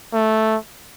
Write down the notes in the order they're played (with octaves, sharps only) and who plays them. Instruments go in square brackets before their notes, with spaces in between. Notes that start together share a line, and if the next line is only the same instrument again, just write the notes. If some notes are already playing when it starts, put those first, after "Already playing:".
[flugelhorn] A3